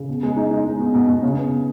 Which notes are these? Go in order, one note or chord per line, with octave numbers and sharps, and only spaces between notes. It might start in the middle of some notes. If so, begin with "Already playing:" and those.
Already playing: C#3
B2
G#3
D#4
D#4
G#3
B2
B2
B2
C#3
B3